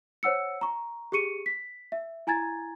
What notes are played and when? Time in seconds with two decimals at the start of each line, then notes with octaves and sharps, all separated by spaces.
0.23 C5 C#5 F#5 E6 C#7
0.61 A#5 C#6
1.12 G4 G#4 C#6 C#7 D#7
1.46 B6
1.92 E5
2.27 E4 G#5 A#5 G#6 A6